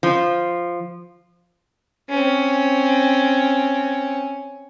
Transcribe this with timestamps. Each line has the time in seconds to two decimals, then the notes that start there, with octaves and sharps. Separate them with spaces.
0.03 F3
2.10 C4 C#4